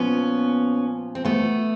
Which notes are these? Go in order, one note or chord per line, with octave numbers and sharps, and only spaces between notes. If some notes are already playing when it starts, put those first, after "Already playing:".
Already playing: A#2 F3 B3 C#4
C4
A3 B3